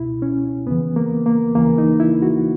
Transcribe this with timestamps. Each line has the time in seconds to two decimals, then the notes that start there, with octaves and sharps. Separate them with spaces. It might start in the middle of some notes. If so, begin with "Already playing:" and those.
Already playing: C#2 B2 E4
0.22 C#4
0.67 E2 C#3 E3 B3
0.96 A#3
1.26 A#3
1.55 D#2 C#3 E3 A#3
1.78 D#4
2.00 E4
2.22 F#4